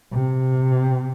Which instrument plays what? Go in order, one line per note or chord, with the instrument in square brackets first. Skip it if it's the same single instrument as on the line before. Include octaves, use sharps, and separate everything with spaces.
[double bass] C3